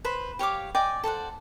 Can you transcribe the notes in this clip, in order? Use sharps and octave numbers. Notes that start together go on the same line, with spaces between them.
B4 C5 B5
G4 C#5 F5 D6
D5 D#5 G5 G#5
A4 C5 D5 F#5